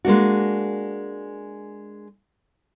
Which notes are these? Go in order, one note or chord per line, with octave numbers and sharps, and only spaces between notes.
G#3 A#3 D4 F#4